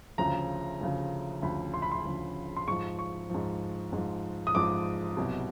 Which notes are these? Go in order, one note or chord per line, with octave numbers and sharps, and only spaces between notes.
D2 C#3 F3 A#5
D2 C#3 F3
D2 C#3 F3 B5
C6
B5
C6
D2 C#3 F3
C6
G#2 F3 C#6
C#6
G#2 F3
G#2 F3
D#6
G#2 F3 D6
C2 B2 F#3